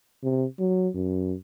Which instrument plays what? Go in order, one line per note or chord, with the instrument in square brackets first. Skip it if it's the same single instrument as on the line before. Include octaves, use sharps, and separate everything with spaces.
[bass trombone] C3
F#3
F#2